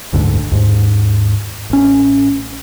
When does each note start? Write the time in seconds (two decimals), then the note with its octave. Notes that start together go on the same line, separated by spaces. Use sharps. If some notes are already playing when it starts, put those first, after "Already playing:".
0.13 F#1 D2 G#2 D3
0.52 D#2 G#2
1.70 A1 C#4